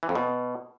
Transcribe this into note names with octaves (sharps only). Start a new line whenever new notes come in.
E3
F2
B2